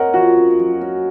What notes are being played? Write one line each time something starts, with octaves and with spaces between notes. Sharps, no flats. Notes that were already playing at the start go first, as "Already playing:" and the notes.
Already playing: C4 A#4 C#5 D#5 F#5
F3 F#4
C#4
F#3
C#4